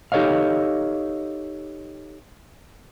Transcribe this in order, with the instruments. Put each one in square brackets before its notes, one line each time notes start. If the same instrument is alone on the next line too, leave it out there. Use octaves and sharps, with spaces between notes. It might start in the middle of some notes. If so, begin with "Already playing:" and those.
[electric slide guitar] D#4 G4 A4 C#5 D#5 F5